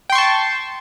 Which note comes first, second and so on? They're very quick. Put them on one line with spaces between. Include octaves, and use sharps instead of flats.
G5 C6 C#6 A5